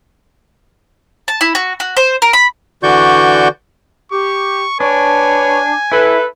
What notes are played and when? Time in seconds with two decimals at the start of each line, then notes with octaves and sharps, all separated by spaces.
1.28 A5
1.41 E4
1.55 F#4
1.80 F#4
1.97 C5
2.22 A#4
2.33 B5
2.83 D3 E3 F#4 D5 C#6 G6
4.12 G4 C#6
4.80 D4 B4 C#5 G#5
5.92 E4 A4 B4